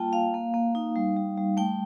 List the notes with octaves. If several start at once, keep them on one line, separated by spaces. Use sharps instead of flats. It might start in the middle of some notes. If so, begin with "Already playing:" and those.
Already playing: G3 A#3 F4 G5 A5
A#3 F5
A#3
A#3
D#4
G3
G3
G3
A3 G5